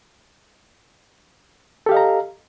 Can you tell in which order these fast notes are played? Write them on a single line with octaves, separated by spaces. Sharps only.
A4 G4 F5 D#5 A#5